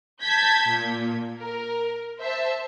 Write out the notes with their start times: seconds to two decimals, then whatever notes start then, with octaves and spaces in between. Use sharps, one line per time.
0.22 A5 G6 G#6 B6
0.68 A#2
1.39 A#4
2.19 C5 E5 A5